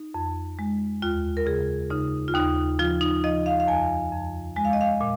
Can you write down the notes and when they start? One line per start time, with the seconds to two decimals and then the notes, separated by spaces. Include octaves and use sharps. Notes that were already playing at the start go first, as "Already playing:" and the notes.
Already playing: D#4
0.14 F2
0.59 G#3
1.02 D#2 F4
1.37 A#4
1.46 C#3 G#4
1.90 C#3 D#4
2.28 F4
2.34 D#2 D#4
2.79 F3 F4
3.01 D#4
3.24 F3 D#5
3.46 F5
3.60 F5
3.67 F2 G#5
4.12 F2
4.56 G#3 G#5
4.65 F5
4.73 D#5
4.81 F5
5.01 A#2